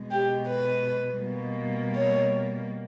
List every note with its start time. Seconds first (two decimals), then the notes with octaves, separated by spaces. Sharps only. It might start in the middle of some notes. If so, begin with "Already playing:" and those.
Already playing: B2 G#3
0.11 G4
0.48 B4
1.21 B2 G3 A#3
1.96 C#5